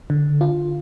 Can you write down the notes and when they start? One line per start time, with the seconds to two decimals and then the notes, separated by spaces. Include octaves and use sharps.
0.10 D3
0.41 F4